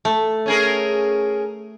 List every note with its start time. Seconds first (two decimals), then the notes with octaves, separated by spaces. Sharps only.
0.05 A3
0.46 C#4 G#4 A#4